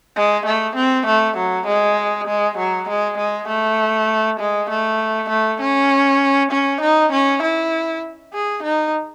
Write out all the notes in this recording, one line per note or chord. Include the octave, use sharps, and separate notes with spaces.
G#3
A3
C4
A3
F#3
G#3
G#3
F#3
G#3
G#3
A3
G#3
A3
A3
C#4
C#4
D#4
C#4
E4
G#4
D#4